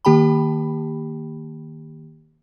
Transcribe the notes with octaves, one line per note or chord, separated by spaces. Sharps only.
D#3 A#3 G4 G5 A5 B5